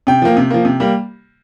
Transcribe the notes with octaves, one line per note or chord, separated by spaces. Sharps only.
C3 G5
F3 A#3
C3
F3 A#3
C3
G3 A#3